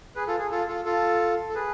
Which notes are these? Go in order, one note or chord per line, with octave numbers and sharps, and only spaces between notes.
G#4 B4
F4 A4
G#4
F4 A4
F4 A4
F4 A4
A4
G#4 B4